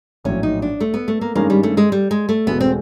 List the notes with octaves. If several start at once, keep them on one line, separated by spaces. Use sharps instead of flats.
A#1 A2 F#3 C#4
D#4
D4
A3
B3
A3
A#3
G2 D#3 G#3 A#3 C#4
G3
A3
G#3
G3
G#3
A3
E1 E2 B2 G#3 B3
C4